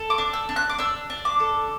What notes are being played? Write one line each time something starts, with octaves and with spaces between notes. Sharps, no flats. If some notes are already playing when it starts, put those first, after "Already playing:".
Already playing: A4
D6
D4
E6
D4
F#6
D6
D4 E6
D4
D6
A4